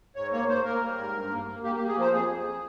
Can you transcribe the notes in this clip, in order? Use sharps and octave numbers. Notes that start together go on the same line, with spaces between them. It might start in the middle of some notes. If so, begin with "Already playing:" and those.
G#2 C#5
A#3 C#5
A#3 C5
A#3 A#4
G3
G#2
G2
A#3
A#3
A#3 G4
G4
A#3
G#4
F3 C5
F2 G#4
F2